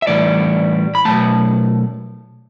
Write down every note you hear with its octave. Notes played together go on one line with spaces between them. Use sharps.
E5
A2 E3 G3 D5
B5
B2 F#3 A3 A5